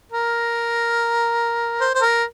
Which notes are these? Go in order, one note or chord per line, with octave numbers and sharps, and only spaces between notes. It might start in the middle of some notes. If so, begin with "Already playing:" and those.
A#4
C5
C5
A#4